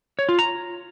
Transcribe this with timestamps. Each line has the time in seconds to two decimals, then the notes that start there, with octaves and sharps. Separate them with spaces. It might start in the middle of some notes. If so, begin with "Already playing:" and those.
0.19 C#5
0.29 F4
0.39 A#5